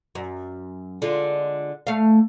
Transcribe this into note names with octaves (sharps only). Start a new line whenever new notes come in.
F#2
D3 G#3 F4
A3 F5